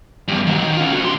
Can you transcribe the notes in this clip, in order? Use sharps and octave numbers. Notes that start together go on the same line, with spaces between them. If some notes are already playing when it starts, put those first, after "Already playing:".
E2 G2
D#3 F#3
D#3
C#4 F4
D3 F#4
C3 C6